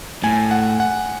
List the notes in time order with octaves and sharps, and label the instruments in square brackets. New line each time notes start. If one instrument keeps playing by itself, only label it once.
[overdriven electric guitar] A2 [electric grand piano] G#5
[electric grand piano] F#5
F#5